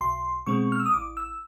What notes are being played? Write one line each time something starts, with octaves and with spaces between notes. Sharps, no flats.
B1 C6
B2 G#3 C4 C#6
F6
E6
D#6
A1 D6
E6